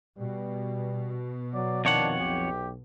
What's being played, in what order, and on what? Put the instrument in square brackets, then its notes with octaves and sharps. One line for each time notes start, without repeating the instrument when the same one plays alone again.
[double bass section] B2 [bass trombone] G3
[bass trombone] F#3 [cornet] D5
[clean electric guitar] F2 C#5 F#5 [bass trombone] D#3 [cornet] D4
[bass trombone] B1 [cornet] G4